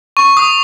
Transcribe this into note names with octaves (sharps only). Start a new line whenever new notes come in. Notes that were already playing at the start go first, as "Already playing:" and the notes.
C#6
D#6